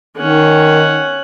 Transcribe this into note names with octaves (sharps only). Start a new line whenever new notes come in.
D#3 C#4 F#5